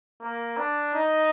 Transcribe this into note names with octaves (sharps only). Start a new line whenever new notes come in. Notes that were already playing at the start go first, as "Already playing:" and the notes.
A#3
D4
D#4